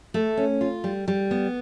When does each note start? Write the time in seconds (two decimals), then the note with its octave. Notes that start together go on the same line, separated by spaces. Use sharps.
0.14 A3
0.37 C#4
0.61 F4
0.84 G3
1.08 G3
1.31 B3